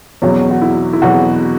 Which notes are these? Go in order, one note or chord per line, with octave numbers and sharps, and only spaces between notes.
E2 B2 F#3 C#4
F#4
E4
E4
E2 B2 F#3 F#4